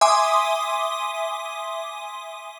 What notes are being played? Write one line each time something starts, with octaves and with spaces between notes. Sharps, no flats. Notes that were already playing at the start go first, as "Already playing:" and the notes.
E5 G#5 C6 D6 D#6